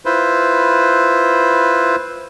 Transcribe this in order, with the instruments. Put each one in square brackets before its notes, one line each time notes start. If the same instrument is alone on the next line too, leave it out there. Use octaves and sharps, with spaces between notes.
[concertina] E4 F4 B4 C5